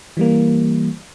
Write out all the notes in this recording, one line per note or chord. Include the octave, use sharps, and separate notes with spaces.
E3 G3 A#3